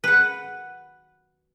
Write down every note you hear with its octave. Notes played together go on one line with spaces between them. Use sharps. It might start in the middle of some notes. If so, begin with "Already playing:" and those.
B4 F#5